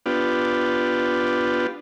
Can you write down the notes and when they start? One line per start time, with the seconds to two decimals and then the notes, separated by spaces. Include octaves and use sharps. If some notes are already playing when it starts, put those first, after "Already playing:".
0.06 B3 D4 F4 G4